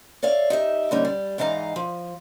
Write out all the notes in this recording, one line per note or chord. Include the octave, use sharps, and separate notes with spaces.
C#5 D5 E5 F5
D#4 G4 E5
D3 G3 A#3 C#4 D#4
G3
G#2 E3 D#4 E4 F5 A#5
F3